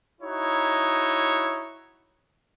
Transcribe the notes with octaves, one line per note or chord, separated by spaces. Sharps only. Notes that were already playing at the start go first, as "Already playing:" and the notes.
D#4 E4 F#4 C#5